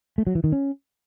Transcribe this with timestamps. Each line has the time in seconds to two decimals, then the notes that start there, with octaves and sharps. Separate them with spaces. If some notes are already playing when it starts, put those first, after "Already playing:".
0.18 A3
0.27 F#3
0.35 E3
0.44 D#3
0.52 C#4